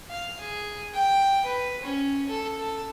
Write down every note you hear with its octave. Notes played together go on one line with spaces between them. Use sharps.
F5
G#4
G5
B4
C#4
A4
A4